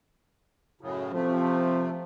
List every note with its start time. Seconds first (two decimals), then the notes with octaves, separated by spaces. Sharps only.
0.81 F#2 A2 C#3
1.13 C3 F3 A3 C4